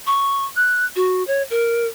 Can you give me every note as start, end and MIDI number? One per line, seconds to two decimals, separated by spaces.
0.07 0.45 85
0.56 0.86 90
0.96 1.23 66
1.27 1.42 73
1.50 1.87 70